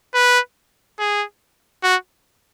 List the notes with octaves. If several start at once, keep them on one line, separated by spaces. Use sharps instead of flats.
B4
G#4
F#4